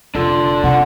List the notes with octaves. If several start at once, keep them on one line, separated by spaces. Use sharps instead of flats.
F1 D4 F4 A4
C3 F#5